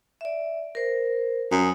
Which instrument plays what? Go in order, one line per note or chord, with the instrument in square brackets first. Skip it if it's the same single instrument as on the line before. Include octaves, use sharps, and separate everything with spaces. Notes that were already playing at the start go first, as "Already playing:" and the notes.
[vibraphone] D5 E5
A#4 C5
[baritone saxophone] F#2 [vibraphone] D#6